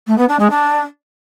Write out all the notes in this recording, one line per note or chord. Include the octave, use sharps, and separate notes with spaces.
A3
B3
D4
G#3
D4